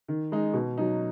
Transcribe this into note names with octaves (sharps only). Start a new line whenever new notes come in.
D#3
G#3 D#4
B2
F#3 D#4